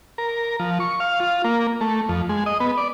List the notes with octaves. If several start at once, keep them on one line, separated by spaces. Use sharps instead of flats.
A#4
F3
C#6
F5
F4
A#3
A3
F2
G#3
D#5
B3
D5